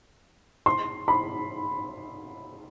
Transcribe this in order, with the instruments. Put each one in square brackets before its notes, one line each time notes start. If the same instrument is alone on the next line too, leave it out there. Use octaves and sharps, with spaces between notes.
[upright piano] C6
B5